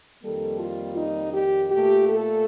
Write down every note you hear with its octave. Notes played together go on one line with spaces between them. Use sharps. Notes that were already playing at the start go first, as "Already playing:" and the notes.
F2 D#3 G3 A#3 A4
F4
D#4
G4
A#2 A3 G4
A4